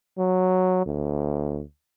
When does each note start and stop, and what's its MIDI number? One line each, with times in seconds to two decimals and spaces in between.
0.18 0.85 54
0.86 1.62 38